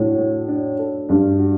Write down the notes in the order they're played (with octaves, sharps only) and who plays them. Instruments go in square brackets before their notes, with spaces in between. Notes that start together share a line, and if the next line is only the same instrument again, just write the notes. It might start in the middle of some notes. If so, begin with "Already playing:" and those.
Already playing: [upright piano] A2 [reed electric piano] D4 F#4 A4
[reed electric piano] A3
D4
A4
[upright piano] G2 [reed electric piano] D4
[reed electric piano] F#4